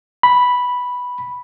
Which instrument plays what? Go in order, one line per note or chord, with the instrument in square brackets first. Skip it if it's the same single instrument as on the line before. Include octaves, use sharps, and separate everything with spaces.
[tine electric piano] B5